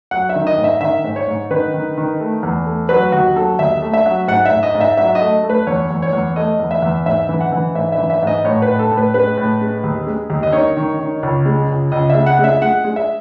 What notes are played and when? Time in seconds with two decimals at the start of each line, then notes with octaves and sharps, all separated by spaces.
0.11 F#3 F#5
0.29 E5
0.36 D#3
0.47 D#5
0.58 G#2
0.64 E5
0.81 D#3 E5
1.04 G#2
1.16 C#5
1.27 G#2
1.51 D#3 B4
1.74 D#3
1.97 D#3
2.20 A3
2.43 E2
2.66 A3
2.89 F#3 B4
3.12 D#2 F#4
3.36 F#3 A4
3.59 D#2 E5
3.82 A3
3.94 E5
4.06 F#3
4.28 G#2 F#5
4.45 E5
4.51 G#2
4.63 D#5
4.75 G#2
4.80 E5
4.97 F#3 E5
5.15 D#5
5.21 A3
5.43 A3
5.50 B4
5.67 E2 C#5
5.91 E2
6.02 C#5
6.13 E2
6.36 A3 D#5
6.59 E2
6.71 E5
6.82 E2
7.06 G#2 E5
7.29 E3
7.41 F#5
7.52 E3
7.75 G#2 E5
7.92 E5
7.98 E3
8.10 E5
8.22 G#2 D#5
8.44 A2 C#5
8.62 B4
8.68 A2
8.79 A4
8.91 A2
8.97 B4
9.14 G#3 B4
9.37 A2
9.61 G#3
9.84 D#2
10.07 G#3
10.30 D#2
10.43 D#5
10.52 D#3 C#5
10.77 D#3
10.99 D#3
11.23 C#2
11.46 G#3
11.68 C#2
11.92 C#2 D#5
12.10 G#3 E5
12.26 F#5
12.39 G#3
12.44 E5
12.62 G#3 F#5
12.85 G#3
12.96 E5